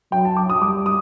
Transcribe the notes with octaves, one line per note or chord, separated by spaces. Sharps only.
F#3 G5
A5
D6
D#6
G3 D6
D#6